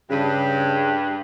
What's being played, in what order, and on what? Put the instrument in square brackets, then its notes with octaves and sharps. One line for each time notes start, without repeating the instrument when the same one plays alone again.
[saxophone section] G2 [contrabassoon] C#3